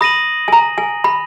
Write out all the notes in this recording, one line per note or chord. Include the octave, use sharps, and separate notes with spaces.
B5 D#6 A#6 D#7 F#7
G#5
A#5
G#5
B5